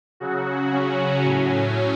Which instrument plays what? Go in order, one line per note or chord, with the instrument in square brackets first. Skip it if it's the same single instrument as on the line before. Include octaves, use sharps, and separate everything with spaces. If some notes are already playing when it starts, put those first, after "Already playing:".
[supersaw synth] C#3 F#3 F#4
C#4
A2 F#3